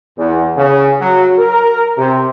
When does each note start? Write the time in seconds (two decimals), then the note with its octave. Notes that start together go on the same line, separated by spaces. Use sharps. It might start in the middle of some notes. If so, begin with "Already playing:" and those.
0.17 E2
0.56 C#3
1.00 F#3
1.38 A#4
1.98 C3